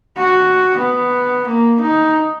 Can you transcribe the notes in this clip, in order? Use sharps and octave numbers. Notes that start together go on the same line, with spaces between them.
F#4
B3
A#3
D#4